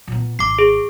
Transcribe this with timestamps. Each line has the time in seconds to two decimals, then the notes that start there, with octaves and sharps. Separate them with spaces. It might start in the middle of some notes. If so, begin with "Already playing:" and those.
0.07 A#2 B3
0.39 G#1 D6 C7
0.59 G#4